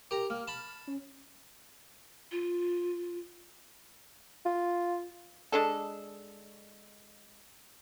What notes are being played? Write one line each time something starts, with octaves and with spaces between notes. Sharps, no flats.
G4 A#4 A#5
A#3 F6
A5 B5
C#4
F4
F4
G#3 D4 A4